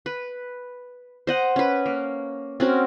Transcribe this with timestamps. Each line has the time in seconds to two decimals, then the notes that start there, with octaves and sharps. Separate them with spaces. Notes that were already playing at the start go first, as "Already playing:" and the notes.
0.06 B4
1.27 C5 D#5 F#5
1.56 C#4 B4
1.86 A#3
2.60 C4 C#4 F#4 A#4